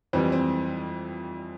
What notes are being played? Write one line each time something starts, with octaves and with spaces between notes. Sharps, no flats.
F2 E3 G3 C4
C4